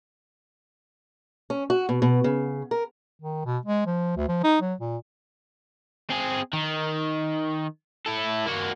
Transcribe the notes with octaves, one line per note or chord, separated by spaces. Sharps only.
C#4
F#4
B2
B2
C#3
A#4
D#3
B2
G#3
F3
D2
F3
D#4
F#3
A#2
C4 G#4
D#3
E4 A4
A#3 F#4